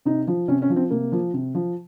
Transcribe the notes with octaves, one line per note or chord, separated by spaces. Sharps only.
C3 D#4
F3
C3 C#4
C#4
F3
C4
C3 A#3
F3
C3
F3